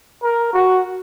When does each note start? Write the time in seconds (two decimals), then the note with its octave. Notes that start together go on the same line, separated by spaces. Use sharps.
0.23 A#4
0.53 F#4